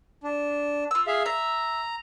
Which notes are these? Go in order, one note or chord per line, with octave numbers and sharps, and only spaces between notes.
D4
F4 E6
G#4 E5 F5
E5 A#5